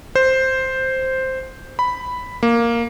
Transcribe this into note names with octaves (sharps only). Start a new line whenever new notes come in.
C5
B5
A#3